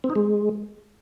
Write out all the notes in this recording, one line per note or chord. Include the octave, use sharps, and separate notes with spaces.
C4
D#4
G#3